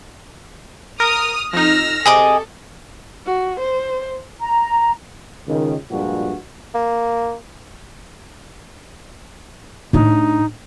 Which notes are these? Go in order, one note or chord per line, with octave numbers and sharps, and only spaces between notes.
A#4 D#6 F6
F2 D#4 E6 F6 A#6
C3 G#4 A4 D#5 D6
F#4
C5
A#5
C#2 D#3
G2 A#2 F3 G3 G#3 F#4
A#3
A2 D4 D#4